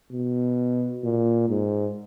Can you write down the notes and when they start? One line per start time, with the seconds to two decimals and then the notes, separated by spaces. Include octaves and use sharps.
0.12 B2
1.04 A#2
1.49 G#2